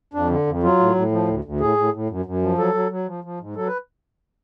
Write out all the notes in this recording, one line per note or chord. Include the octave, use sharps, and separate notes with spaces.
F2 D4
D3
F2
F#3 F4
A2
A2
F3
D2
D2
A2 G#4
A2
A2
F#2
F#2
F3
F#3 A4
F#3
F#3
F3
F3
G#2
F#3 A4
B4